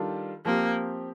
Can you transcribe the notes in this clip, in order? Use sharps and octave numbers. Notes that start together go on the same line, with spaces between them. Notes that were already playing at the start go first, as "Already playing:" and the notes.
Already playing: D#3 G3 D4 F4 A4
F3 A#3 C4 G4